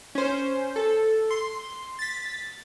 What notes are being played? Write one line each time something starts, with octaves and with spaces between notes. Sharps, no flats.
C#4 C5
A4
C6
A6 B6